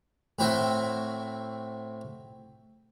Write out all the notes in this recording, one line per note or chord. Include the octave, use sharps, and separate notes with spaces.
A2 C4 E4 F#4 C5 E5